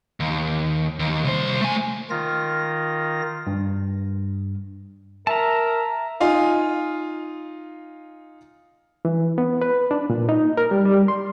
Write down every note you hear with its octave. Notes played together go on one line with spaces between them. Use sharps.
D#2
D#2
C2 C5
A3 G#5
D#3 F4 A#6
G2
A#4 E5 A5 A#5
D#4 F4 F5 G#5
E3
B3
B4
D4
A#2
D#4
A#4
G3
G3
C6